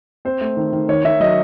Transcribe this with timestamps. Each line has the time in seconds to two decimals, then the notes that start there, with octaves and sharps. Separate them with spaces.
0.25 C4 C5
0.41 A3
0.57 D#3
0.73 D#3
0.89 D#3 C#5
1.05 D#3 E5
1.20 F#3 D#5